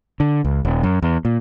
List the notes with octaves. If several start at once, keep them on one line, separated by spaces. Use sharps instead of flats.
D3
C#2
D#1
F#2
E2
A#2